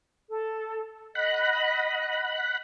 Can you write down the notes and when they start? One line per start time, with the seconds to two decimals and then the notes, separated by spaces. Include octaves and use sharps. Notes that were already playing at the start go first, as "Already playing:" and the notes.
0.31 A4
1.15 D#5 F#5 B5 F#6